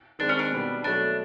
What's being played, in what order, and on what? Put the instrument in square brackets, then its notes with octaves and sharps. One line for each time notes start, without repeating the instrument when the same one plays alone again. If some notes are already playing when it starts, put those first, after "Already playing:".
[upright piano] D#3 G#3 C4 [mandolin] D4
[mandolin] C#4
D4
[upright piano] B2 G3 B3
[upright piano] B2 F#3 A3 [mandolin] D4